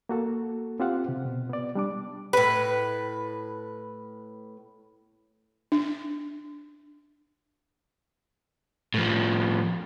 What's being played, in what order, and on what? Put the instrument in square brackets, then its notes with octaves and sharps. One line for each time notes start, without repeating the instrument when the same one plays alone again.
[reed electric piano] A#3 F#4 A4
C4 F4 G4 C5 F5 F#5
C3
B2
B3 D5
G3 D4 D6
[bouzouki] A2 B4
[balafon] D4
[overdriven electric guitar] A2 F3